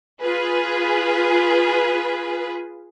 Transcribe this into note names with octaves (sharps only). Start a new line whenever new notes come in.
F4 G#4 B4